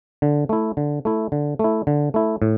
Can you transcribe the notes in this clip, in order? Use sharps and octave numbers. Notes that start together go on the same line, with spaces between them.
D3
A3 E4
D3
A3 E4
D3
A3 E4
D3
A3 E4
A2